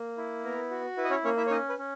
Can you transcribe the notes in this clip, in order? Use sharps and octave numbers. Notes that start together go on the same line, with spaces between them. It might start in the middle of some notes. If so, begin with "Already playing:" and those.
Already playing: A#3
E4
B3 A#4
F#4
E4 B4
D#5
C#4 C#5
A#3 C#4 C#5
E4 E5
C#5
C#4 D#4 D#5
B4
C#4